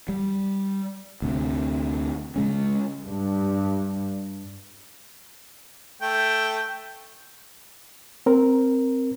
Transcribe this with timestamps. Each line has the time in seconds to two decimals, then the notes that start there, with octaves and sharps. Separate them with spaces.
0.09 G3
1.22 D2 C3
2.36 C#3 G#3 C#4
3.04 G2
6.02 A3 G5
8.26 C4 A#4